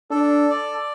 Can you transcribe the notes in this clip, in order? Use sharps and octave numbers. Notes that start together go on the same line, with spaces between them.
D4 A4
D5